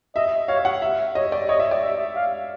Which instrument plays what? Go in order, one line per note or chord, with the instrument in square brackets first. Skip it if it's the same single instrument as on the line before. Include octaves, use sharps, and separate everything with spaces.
[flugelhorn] D#5 [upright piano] E5
[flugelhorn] C#5 [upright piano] F5
[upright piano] F#5
E5
[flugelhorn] C#5 [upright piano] D#5
[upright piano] D5
[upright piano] C#5 [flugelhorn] D#5
[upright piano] E5
D5
[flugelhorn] E5
F5